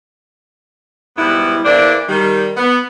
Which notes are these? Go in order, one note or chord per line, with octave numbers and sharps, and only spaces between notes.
G#2 B2 G3 B3 E4
E2 E3 A#3 D4 C5 D5
D#3 G3
B3